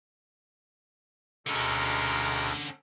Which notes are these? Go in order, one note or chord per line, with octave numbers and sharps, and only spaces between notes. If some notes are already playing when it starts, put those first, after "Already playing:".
D2 B2 D3 G#3 C#4 A4 A#4 E6